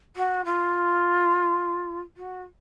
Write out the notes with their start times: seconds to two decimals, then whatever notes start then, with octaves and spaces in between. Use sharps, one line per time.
0.16 F#4
0.45 F4
2.17 F#4